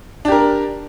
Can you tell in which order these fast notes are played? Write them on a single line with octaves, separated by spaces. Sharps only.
D4 G4 A#4